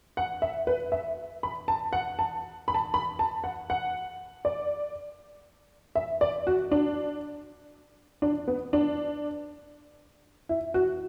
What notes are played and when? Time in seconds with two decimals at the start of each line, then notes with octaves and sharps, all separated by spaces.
0.17 F#5
0.42 E5
0.67 B4
0.92 E5
1.43 B5
1.68 A5
1.93 F#5
2.19 A5
2.68 B5
2.74 A5
2.94 B5
3.19 A5
3.44 F#5
3.70 F#5
4.45 D5
5.95 E5
6.21 D5
6.47 F#4
6.72 D4
8.22 D4
8.48 B3
8.73 D4
10.49 E4
10.74 F#4